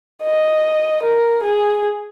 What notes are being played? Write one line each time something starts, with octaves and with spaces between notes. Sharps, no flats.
D#5
A#4
G#4